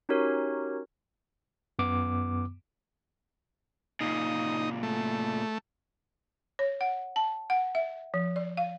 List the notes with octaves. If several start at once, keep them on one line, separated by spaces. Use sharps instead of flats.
C#4 D#4 F#4 G4 A#4 C#5
F#2 B3 D6
A#2 C#3 D#4
A3
C#5
F#5
A5
F#5
E5
F3
D5
F5